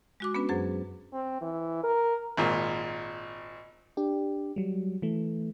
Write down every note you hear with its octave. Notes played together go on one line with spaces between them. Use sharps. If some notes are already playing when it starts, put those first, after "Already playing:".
G#3 F#4 D6
B3 C#4 D4 B4
F#2 F#3 G#4 C5
C4
E3
A#4
G#1 A#2
D4 G4
F#3 G3
E3 A3